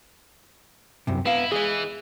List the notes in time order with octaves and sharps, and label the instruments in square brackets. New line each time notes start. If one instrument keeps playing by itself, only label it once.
[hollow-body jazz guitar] C2 F#2 C3
[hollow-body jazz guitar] B3 F5 [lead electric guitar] E4
[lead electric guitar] E3 [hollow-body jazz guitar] G#4 D#5